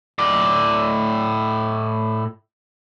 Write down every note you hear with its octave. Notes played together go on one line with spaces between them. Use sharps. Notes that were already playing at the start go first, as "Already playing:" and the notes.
A2 D5